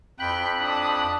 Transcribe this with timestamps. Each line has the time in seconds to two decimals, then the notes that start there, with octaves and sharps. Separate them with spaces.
0.20 F2 G5 B5 F#6
0.59 D4 D#6